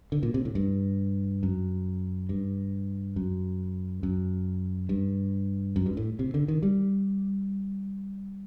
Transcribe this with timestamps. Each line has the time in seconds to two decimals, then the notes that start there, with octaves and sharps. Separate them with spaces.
0.12 D3
0.23 A#2
0.34 C3
0.45 A2
0.55 G2
1.43 F#2
2.29 G2
3.16 F#2
4.03 F#2
4.89 G2
5.76 F#2
5.86 G2
5.97 A2
6.19 C3
6.34 D3
6.48 D#3
6.63 G3